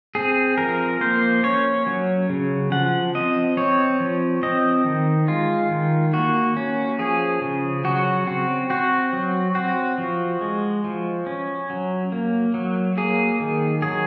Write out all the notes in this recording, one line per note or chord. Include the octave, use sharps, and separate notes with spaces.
C4 G#4
F3 A#4
A#3 C5
C#4 C#5
F#3
C#3
F3 F#5
C4 D#5
C4 C#5
F3
C4 D#5
D#3
G#3 F4
D#3
A#3 F#4
C#4
F3 G#4
C#3
F#3 F#4
C4 F#4
C4 F#4
F#3
C4 F#4
F3
G#3
F3
C#4
F#3
A#3
F#3
A#3 G#4
D#3
F#3 G#4